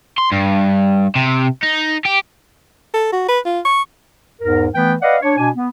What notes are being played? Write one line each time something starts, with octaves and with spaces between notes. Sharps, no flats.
C6
G2
C3
D#4
G4
A4
F#4
B4
F4
C#6
E2 G#2 A#4
E3 A3 B3 B4 G5
B4 D5 D#5 F5 F#5
D4 C#5
B2 D4 G#5
B3